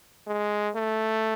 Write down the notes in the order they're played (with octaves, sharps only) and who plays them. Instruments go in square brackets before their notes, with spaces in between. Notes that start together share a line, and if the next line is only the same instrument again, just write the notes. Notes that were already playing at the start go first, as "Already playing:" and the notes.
[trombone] G#3
A3